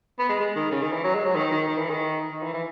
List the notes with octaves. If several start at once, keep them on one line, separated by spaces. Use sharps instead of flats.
B3
G#3
G#3
D#3
C#3
D#3
E3
F#3
G#3
F#3
D#3
D#3
D#3
E3
D#3
D#3
E3
E3